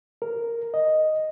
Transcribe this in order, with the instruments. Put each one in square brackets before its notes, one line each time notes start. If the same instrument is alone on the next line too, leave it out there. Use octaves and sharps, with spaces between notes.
[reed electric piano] A#4
D#5